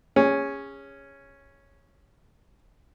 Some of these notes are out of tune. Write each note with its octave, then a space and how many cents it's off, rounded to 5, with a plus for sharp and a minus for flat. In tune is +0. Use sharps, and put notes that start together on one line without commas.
C#4 +0 G#4 -30